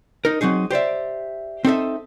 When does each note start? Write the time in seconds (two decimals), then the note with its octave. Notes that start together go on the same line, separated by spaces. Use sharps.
0.25 D#4 A#4
0.41 F#3 C4 D#4 G#4
0.70 G4 C5 D5 E5
1.65 C4 D#4 A4 E5